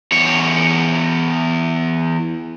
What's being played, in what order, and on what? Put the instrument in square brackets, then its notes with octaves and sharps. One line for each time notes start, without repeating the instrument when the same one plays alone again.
[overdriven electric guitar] E2 C#5